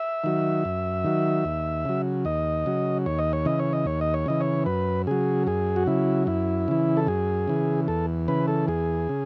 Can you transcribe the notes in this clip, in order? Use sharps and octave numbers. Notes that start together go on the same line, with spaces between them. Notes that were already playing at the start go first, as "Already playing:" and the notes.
Already playing: E5
D#3 F#3
F#2
D#3 F#3
D#2
C#3 F#3
D#2 D#5
C#3 F#3
D#2 C#5
D#5
C#5
C#3 E3 D#5
C#5
D#5
D#2 C#5
D#5
C#5
C#3 E3 D#5
C#5
F#2 B4
C#3 F#3 G#4
F#2 G#4
F#4
C#3 F#3 E4
F#2 E4
C#3 E3
A4
F#2 G#4
C#3 E3
E2 A4
C#3 E3 B4
A4
E2 G#4
C#3